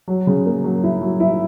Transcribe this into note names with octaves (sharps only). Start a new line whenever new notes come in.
F#3
C#3
A#3
F#3
E4
F#3
E4